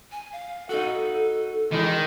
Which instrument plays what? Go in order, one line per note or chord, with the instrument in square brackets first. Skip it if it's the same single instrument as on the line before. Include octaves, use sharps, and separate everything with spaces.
[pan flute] G#5
F5
[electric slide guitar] D#4 F#4 [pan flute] A4
[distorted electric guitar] D#3 [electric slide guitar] E3 G#3 D4